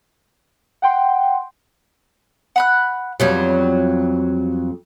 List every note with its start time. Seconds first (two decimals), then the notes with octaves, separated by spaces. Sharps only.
0.82 F#5 G5 C6
2.56 F#5 B5 F#6
3.20 F2 F#3 G3 B3